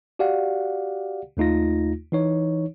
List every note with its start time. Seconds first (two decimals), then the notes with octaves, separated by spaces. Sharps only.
0.19 F#4 G4 D5 F5 F#5
1.37 D#2 A3 D#4 F4 A#6
2.12 E3 D#4 C#5